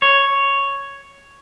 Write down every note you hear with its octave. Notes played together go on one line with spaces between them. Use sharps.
C#5